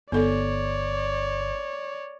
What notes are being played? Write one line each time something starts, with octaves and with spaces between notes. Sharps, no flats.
G1 B3 A4 C#5 D5